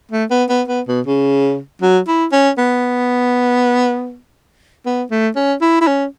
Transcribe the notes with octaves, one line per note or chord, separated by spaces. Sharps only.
A3
B3
B3
B3
B2
C#3
F#3
E4
C#4
B3
B3
A3
C#4
E4
E4
C#4